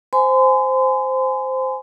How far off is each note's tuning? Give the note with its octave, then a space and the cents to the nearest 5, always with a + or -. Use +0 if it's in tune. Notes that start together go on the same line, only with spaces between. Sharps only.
C5 -5 G#5 +10 C6 -40